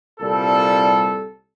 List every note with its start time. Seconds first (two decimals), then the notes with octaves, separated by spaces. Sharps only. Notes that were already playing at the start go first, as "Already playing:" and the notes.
0.20 C2 A#2 G3 A4